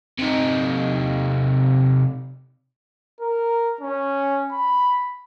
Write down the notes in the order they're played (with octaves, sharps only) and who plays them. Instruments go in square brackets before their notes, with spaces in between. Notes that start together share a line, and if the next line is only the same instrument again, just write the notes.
[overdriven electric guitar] C3 D#4
[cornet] A#4
C#4
B5